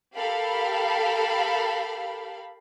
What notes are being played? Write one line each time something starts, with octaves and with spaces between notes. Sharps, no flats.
G4 A4 A#4 F5 B5